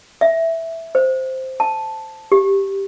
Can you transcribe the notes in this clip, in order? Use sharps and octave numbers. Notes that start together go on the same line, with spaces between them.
E5
C5
A5
G4